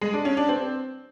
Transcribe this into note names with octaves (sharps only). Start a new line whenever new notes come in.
G#3
D4
C#4
D4
C4